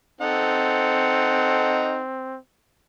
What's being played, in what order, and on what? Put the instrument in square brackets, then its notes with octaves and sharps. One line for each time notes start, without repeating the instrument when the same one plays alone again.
[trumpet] C4 [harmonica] D#4 A4 F#5